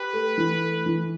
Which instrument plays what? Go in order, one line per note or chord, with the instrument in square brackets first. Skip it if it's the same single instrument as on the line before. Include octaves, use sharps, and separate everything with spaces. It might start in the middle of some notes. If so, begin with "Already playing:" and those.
Already playing: [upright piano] G4 [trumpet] B4
[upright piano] A3
E3
A3
E3